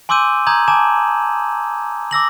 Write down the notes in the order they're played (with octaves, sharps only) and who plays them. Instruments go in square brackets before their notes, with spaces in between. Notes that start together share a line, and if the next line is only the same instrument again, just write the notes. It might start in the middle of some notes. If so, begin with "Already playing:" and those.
[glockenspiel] G#5 C6 D6 E6 G6 D#7
A#5 D#6 G6 G#6 F#7
G#5 A5 D6 E7
D6 E6 A#6 F#7